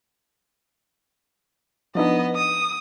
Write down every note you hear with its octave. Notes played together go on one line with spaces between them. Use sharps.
F3 B3 D4 D#4 D#5
D#6